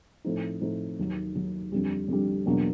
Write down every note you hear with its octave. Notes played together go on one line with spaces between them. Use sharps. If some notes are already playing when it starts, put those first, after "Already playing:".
A2 F3 A3 C4 D#4
A2 F3 A3 C4 D#4
D#2 D#3 F#3
D#2 D#3 F#3
F2 D3 G3
F2 D3 G3
E2 B2 F#3 A#3 D4